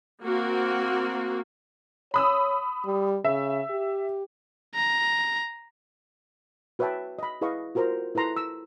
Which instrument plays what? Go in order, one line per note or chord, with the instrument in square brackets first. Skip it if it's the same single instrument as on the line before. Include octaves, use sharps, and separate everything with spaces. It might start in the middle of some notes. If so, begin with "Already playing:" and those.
[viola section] A#3 C4 F#4
[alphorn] C#5 [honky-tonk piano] B5 D#6 E6
[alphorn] G3
[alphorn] C#3 [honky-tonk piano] E5
[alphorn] G4
[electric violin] A#5
[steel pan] F#4 B4 C#5 E5 G5 A5
D#5 B5
E4 G#4 B4 D#5 F5 C#6
F4 F#4 A#4 C5 A#5
E4 A4 B4 A#5 C6
E6